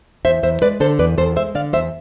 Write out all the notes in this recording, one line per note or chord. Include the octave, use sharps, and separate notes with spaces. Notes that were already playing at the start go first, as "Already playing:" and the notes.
E2 C5 E5
E2 C5 E5
G#3 B4 D5
D3 A4 C5
E2 B4 D5
E2 A4 C5
G#3 C5 E5
D3 D5 F5
E2 C5 E5